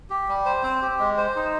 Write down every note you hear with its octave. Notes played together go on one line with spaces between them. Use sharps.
G4
G3
C5
C4
G4
G#3
C5
D#4